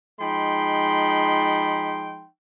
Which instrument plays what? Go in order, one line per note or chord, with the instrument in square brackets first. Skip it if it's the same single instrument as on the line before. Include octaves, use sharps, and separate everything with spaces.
[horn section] F3 G#3 D#4 G5 B5 C6